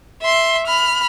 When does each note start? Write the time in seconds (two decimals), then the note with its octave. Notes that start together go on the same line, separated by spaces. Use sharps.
0.21 E5 C6
0.67 B5 F6